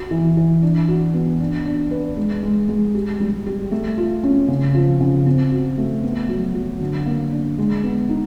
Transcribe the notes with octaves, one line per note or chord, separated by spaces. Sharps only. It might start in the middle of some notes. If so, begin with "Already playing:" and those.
Already playing: F#4
E3
E3
D4
F#4
B3
D4
D4
B4
G#3
G#3
G#3
G4
G3
G4
A3
F4
C#4
C#3
F3
C#3
C4
F#4
A3
B3
F#3
F#3
D3
A#3
D4
G#3
B3
D#4